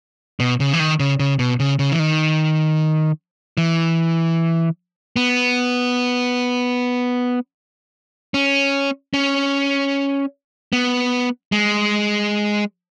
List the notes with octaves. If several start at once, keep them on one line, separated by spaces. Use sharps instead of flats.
B2
C#3
E3
D#3
C#3
C#3
B2
C#3
C#3
E3
D#3
E3
B3
C#4
C#4
B3
G#3